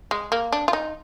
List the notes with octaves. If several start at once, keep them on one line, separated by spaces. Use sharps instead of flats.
G#3
A#3
D4
F4
D#4